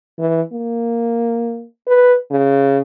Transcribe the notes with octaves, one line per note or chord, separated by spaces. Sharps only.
E3
A#3
B4
C#3